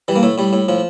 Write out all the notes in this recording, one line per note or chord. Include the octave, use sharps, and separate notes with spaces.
E3 G3
A#3
A2 A3
A2 G3
A2
A2 F3